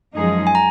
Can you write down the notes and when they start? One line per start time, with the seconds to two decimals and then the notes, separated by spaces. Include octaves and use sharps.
0.15 F#2 F3 G#3 D#4 G#4
0.47 G#5
0.55 A#5